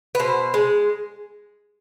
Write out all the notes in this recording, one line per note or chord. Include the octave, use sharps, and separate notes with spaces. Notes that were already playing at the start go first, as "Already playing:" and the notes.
B4
B2 C5
G#3